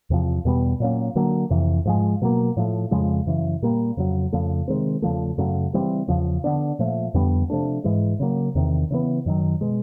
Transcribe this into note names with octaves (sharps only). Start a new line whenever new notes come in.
E2 C3 F3
E2 B2 G3 B3
A#2 F#3 A#3 C#4
D3 F#3 A#3
F2 C3 E3
G#2 F3 G#3
B2 F#3 A#3
A2 F3 A3
F2 C#3 F3 G#3
F#2 C#3 E3
A#2 G3 A#3
F2 C#3 F#3
F2 C#3 F3 A3
C3 D#3 G#3 C4
E2 C#3 F3 A3
F#2 C#3 F#3 A3
C#3 E3 G3 C4
E2 C#3 F3
D3 F#3 B3 D4
A#2 F3 A3
F2 D3 G3 B3
C3 F3 A3 D4
G#2 E3 G#3
C#3 F#3 A#3
E2 C3 D#3
C#3 E3 G3 B3
F#2 D#3 F#3
B2 G#3